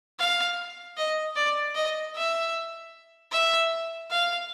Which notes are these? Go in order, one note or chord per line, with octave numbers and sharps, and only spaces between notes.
F5
D#5
D5
D#5
E5
E5
F5